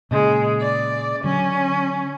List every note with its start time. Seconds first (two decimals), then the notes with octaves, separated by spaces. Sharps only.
0.11 A#2 C#3 G#3
0.60 D5
1.24 D3 F#3 C#4